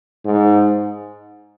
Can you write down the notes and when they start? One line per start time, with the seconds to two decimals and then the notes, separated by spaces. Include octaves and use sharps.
0.25 G#2